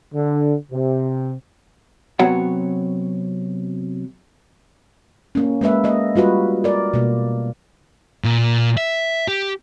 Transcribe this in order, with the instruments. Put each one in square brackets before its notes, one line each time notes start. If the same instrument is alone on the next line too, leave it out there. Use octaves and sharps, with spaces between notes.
[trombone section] D3
C3
[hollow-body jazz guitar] C3 F#3 B3 F#4 C#5 F#5
[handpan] A#3 C#4
G#3 A#3 B4 E5
A#3 D#5
G3 F4 F#4 B4
A#4 D5
B2 A#3
[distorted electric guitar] A#2
E5
G4